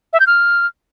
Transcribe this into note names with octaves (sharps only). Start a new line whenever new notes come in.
E5
G6
F6